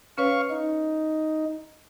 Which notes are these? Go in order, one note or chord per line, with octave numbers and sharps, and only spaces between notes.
C#4 B4 C#5 F5 C#6
D#4